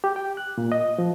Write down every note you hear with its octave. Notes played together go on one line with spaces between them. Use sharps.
G4
G5
F#6
A#2
D#5
F3